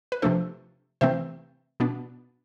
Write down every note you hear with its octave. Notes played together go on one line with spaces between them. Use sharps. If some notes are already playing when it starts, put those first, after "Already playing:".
B4
C3 F3 A3 D4 A4 C5
C3 E3 A3 C4 C5 E5
B2 B3 D4